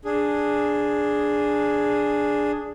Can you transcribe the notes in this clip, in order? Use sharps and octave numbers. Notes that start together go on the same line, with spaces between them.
D4 G#4